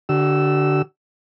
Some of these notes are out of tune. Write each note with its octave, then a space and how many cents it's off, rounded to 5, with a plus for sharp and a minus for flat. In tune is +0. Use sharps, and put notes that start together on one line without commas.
D3 -5 F#4 +45 E6 +0